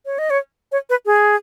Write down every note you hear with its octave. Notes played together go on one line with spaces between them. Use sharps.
C#5
D#5
C#5
C#5
B4
G#4